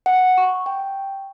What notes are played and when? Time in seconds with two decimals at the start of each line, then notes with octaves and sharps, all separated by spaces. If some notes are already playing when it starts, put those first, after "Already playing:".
0.06 F#5
0.38 C#6
0.66 G5